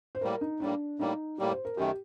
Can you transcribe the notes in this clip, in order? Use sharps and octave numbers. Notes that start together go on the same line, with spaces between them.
C5
A2 G3 A#3 A#4
D#4
A2 G3 A#3 D4
A2 G3 A#3 D#4
A2 G3 A#3 G4
C5
A#4
F#2 D#3 A3 G4